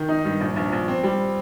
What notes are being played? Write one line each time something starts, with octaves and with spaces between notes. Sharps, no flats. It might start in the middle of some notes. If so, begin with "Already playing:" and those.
Already playing: D#3
D#4
G2
A#1
A#1
A#1
C4
G3